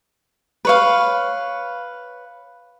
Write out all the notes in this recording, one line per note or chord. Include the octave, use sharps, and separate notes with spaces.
B4 C#5 F5